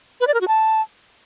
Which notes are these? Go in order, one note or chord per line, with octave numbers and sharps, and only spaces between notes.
B4
D5
A#4
F#4
A5